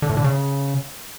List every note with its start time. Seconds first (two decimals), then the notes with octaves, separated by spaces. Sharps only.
0.02 D3
0.10 A2
0.17 D3
0.24 C#3